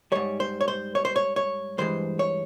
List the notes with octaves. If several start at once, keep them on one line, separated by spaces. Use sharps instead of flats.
G#2 G3 C#5
C5
C#5
C5
C#5
C5
C#5
C#5
G2 E3 G#3 C5
C#5